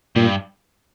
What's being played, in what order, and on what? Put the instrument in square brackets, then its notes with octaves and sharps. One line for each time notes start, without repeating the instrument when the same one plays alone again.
[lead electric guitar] G2 [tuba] A#2